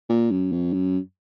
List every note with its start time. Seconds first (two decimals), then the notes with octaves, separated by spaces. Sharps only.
0.09 A#2
0.31 F#2
0.52 F2
0.73 F#2